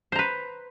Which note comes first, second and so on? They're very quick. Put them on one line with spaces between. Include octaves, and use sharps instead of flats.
C5 A#5 B4